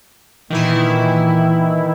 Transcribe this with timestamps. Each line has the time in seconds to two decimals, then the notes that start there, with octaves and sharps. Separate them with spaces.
0.50 A#2 D#3 E3 E4